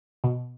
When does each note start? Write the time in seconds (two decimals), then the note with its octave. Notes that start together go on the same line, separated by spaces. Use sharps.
0.24 B2